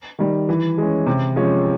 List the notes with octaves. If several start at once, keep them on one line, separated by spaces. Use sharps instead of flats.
D#3 G3
E3
G#3 C#4
C3
F3 G#3 C#4